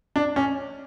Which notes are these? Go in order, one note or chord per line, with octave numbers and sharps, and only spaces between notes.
D4
C#4